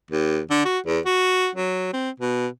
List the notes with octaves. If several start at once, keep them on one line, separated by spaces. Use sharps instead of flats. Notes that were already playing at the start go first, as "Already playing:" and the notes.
D#2
D3
F#4
E2
F#4
F#3
C4
B2